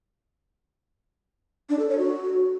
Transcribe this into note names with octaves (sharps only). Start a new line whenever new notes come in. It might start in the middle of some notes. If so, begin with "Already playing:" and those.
D4
A4
C#5
F#4